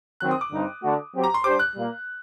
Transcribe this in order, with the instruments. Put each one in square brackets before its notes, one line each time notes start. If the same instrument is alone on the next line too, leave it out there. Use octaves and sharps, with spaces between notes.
[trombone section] D#3 F#3 C4 [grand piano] F#6
[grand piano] D#6
D6
[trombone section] G2 D3 G3 C4 D#4
D3 A3 D4 F#4
F#3 C4 G4 C5
[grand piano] A#5
C6
[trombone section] G3 D4 G4 C5 [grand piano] D6
[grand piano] F#6
[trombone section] A#2 G3 A#3